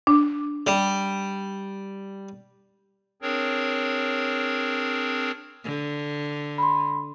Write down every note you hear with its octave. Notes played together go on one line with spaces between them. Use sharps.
D4
G3
C4 D4 G#4 A#4 C#5
D3
B5 C6